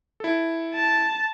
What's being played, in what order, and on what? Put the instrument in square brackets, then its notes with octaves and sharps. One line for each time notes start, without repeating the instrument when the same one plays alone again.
[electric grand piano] E4 A4
[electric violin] A5